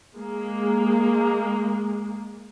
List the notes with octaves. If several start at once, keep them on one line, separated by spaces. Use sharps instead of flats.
G#3 A#3 G#4